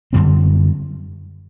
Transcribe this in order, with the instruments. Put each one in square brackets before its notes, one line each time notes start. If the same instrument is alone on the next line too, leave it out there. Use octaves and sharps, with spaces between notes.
[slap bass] F#2 D3 G3 C4